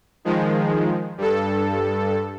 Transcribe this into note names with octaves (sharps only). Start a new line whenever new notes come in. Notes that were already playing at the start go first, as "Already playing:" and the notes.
D#3 F3 G#3
G2 A4